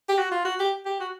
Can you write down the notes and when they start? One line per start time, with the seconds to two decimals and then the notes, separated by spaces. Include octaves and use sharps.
0.09 G4
0.18 F#4
0.31 F4
0.45 F#4
0.60 G4
0.86 G4
1.00 F#4